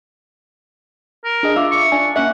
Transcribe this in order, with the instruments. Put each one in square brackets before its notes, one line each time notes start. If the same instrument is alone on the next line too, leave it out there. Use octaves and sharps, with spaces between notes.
[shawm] A#4
[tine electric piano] D4 G#4 D#5
[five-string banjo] F4 [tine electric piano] E5 D6 E6
[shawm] C#6
[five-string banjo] D4 [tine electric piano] G#5
[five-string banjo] A#3 C#4 E5 [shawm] F#5